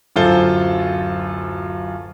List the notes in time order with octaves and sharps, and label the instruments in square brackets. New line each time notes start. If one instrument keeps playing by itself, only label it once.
[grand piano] D1 F#2 F4 A4 C5 G7